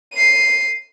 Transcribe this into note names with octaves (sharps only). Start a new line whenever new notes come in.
C7 D#7